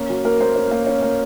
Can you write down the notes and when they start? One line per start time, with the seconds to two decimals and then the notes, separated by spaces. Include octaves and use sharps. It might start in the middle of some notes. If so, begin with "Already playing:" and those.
Already playing: A#3 C#4
0.10 F#3
0.25 A#3 A#4
0.40 A#3 C5
0.56 C#4
0.71 A#3
0.87 C#4
1.02 A#3